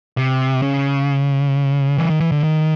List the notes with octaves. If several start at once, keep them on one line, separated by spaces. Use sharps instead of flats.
C3
C#3
E3
D#3
E3
D3
D#3